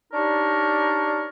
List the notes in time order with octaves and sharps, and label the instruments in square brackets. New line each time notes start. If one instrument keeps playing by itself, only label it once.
[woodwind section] D4 D#4 G4 A#4 C#5 D5